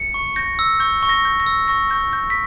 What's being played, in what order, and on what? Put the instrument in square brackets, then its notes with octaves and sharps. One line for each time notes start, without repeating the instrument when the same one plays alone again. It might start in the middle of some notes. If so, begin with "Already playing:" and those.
Already playing: [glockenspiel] C#7
C#6
G6 A#6
E6
C#6 G6
C#6
A#6
G6
A#6
E6
C#6 A#6
C#6 G6
G6
B6